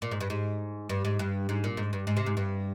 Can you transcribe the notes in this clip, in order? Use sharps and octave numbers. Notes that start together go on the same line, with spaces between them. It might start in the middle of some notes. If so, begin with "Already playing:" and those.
A#2
G#2
G2
G#2
G2
G#2
G2
G#2
A#2
G#2
G2
G#2
C3
G#2
G2